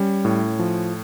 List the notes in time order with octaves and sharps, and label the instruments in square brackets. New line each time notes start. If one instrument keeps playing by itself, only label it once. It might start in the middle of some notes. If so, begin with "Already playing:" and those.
Already playing: [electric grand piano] G3 C#4
A2
F3